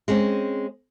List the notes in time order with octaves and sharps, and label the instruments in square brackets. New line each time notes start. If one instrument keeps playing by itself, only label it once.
[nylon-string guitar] G#3 C4 C#4